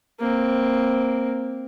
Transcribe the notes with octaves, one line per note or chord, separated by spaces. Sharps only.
A#3 C4